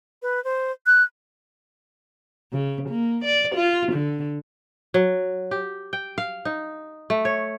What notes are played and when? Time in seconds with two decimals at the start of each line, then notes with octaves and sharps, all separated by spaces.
0.22 B4
0.44 C5
0.86 F#6
2.53 C#3
2.89 A#3
3.24 D5
3.55 F4
3.93 D3
4.94 F#3
5.51 G4
5.93 G5
6.18 F5
6.45 D#4
7.10 A3
7.25 C#5